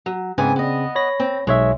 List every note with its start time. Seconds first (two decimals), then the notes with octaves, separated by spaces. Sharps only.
0.06 F#3
0.38 G#2 C#3 B3 C4 G#5
0.56 B3 D#5
0.95 C#5 B5 A#6
1.20 C4
1.47 B1 G#3 C#5 E5